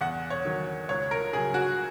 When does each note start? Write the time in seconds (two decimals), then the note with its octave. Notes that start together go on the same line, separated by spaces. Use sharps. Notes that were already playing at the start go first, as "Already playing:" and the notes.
0.01 E2 F#5
0.30 C#5
0.45 D#3 F#3
0.89 C#2 C#5
1.11 A#4
1.33 C#3 F#3 G#4
1.54 F#4